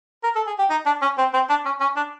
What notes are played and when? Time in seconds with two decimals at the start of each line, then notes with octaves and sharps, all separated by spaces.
0.23 A#4
0.36 A4
0.47 G#4
0.59 G4
0.70 D#4
0.86 D4
1.02 C#4
1.18 C4
1.34 C4
1.50 D4
1.66 C#4
1.81 C#4
1.97 D4